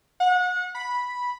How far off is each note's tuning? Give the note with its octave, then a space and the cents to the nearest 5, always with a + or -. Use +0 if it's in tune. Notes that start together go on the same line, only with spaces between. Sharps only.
F#5 -30
B5 -5